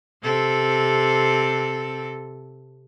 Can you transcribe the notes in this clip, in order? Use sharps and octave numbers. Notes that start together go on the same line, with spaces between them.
C3 C4 A4